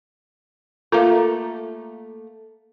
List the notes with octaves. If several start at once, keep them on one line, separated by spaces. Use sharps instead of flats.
A3 A#3 F4 A4 A#4 A#5